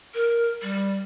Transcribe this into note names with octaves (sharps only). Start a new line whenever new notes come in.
A#4
G3